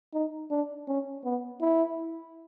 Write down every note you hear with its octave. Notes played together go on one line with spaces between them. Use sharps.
D#4
D4
C#4
B3
E4